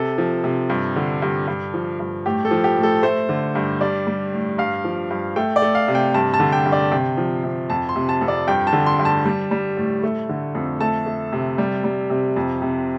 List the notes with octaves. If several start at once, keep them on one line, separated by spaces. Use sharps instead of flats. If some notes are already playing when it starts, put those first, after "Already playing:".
Already playing: C3 A4
F3
C3
G2
D3
G2
G2
F3
G2
A2 G4
A4
F3
G4
A2
A4
A3 C5
D3
G2
G3 D5
G3
A2
G2 F5
F3
G2
A3 G5
D5
A3
F5
C3
G5
G2 A5
A5
D3
G5
G2
D5
C3 G5
F3
C3
F2 A5
C6
C3
A5
F2
D5
G2 G5
A5
D3
C6
G2
A5
G3
G3
A2
A3
D3
F2
A3 A5
A3
C3
G3
G3
C3
F2
C3